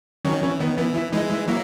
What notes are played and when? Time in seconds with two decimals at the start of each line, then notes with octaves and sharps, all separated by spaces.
0.25 D#3 F#3 C#4
0.43 E3 C#4
0.60 D#3 B3
0.77 E3 B3
0.95 E4
1.12 E3 G#3 D#4
1.31 E4
1.48 F#3 A#3 E4